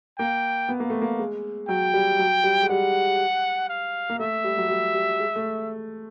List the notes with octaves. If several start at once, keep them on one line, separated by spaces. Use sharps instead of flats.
A#3 G5
B3
A#3
A3
A#3
G#3
F#3 G5
G3
F#3
G3
G#3
G3 F#5
F5
A#3
A3 E5
G3
F#3
G3
G3
G#3
A3